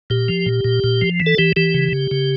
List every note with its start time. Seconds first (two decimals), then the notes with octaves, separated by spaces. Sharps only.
0.10 A#2 G4
0.28 F3
0.46 A#2
0.64 A#2
0.84 A#2
1.01 F3
1.20 E3
1.26 A4
1.38 E3 G4
1.56 E3 G4
1.74 C#3
1.92 C#3
2.11 C#3